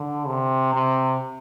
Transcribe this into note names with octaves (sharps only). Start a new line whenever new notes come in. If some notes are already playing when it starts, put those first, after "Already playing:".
Already playing: D3
C3
C3